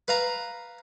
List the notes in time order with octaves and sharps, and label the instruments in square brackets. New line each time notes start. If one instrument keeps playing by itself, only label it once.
[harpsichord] B4 F5 A#5